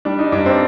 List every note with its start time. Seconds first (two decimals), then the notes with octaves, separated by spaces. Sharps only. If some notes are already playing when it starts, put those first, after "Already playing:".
0.05 G3 D4
0.19 D#4
0.32 G2 D4
0.45 C4